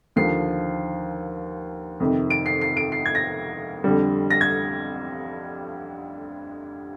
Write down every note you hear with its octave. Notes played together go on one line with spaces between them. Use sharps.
D#2 D3 F3 C7
F2 C3 D#3
D7
C7
C7
D7
C7
G#6
A#6
F2 D3 G3
A#6
G#6